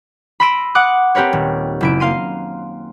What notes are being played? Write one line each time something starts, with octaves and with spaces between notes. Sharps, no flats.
B5 C6 E6 A#6 D7 D#7
F#5 D6 D#6 F#6
C4 G4 A#4 B4 C#5
D#1
F#1 E4 D7
A#3 F5 C6 D#7